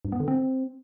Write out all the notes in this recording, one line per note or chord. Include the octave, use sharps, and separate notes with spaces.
G2
B3
D3
C4